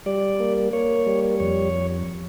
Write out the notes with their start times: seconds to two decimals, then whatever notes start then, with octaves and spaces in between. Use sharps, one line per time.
0.06 G3 D5
0.40 A#3
0.73 A#3 C#5
1.06 G3
1.40 F2 C#5